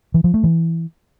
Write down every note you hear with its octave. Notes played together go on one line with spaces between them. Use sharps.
E3
F3
A3
E3